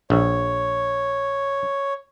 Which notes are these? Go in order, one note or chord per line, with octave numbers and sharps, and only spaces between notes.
A#1 C#5